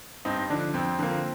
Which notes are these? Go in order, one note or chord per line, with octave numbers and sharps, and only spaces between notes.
G2 C4 D#4
D3 F3 D4
F2 C4
D3 F3 A#3